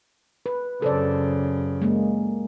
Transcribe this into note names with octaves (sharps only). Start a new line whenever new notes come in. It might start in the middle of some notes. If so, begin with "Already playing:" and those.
B4
F#2 C#3 A4 C5 D5
G#3 A#3